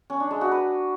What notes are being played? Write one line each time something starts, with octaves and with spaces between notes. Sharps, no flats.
C#4
D4
G#3
F#4
B4